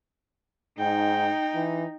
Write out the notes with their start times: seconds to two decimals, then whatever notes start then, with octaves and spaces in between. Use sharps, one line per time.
0.79 G#2 D#4 G5
1.55 E3